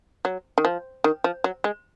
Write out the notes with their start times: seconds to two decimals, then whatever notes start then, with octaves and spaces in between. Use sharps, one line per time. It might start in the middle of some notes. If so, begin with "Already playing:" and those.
0.25 F#3
0.58 D#3
0.65 F3
1.04 D#3
1.24 F3
1.44 F#3
1.64 G#3